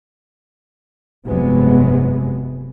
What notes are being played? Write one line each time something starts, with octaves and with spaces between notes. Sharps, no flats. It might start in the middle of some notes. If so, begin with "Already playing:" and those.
F1 G2 C3 F#3 G#3 B3